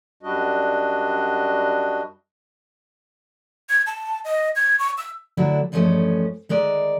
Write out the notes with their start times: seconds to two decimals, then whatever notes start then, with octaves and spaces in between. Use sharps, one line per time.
0.23 F#2 G3 D4 F#4 D#5
3.70 G#6
3.86 A5
4.24 D#5
4.56 G#6
4.79 C#6
4.98 E6
5.37 D2 D3 F#3 D4 E4
5.72 E2 G2 F3 G#3 A3 C#4
6.49 D#3 G#3 A#4 D5